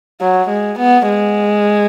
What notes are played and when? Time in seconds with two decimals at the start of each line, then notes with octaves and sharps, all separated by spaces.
0.21 F#3
0.49 G#3
0.79 B3
1.08 G#3